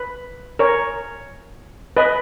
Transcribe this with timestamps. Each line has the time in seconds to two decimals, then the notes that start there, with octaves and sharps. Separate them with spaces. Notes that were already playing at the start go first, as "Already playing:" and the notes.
Already playing: B4
0.59 A#4 C#5
1.97 B4 D#5